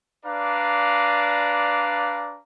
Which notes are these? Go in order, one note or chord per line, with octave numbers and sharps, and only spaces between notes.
D4 B4 D5 F5 A#5